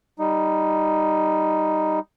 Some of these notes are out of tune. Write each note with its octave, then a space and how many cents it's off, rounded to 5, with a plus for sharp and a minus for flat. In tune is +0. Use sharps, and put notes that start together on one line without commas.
G3 +0 D#4 +0